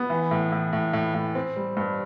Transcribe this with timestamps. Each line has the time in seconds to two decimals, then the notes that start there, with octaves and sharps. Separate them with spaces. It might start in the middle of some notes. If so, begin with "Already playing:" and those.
Already playing: B3
0.10 E3
0.31 A2
0.52 A2
0.73 A2
0.93 A2
1.14 A2
1.35 C4
1.56 G3
1.77 G2